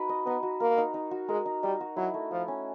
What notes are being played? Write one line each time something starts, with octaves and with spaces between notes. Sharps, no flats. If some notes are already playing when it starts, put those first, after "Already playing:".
Already playing: D#4 F#4 B4
D#5
B3 D#4
F#4
A#3 A#4
D#4
D#4
F#4
G#3 A#4
D#4
G3 D#4
F#4
F#3 E4
A3
F3 A3
C#4